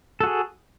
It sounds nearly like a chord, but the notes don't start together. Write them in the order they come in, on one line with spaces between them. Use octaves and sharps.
A4 F#4 G#4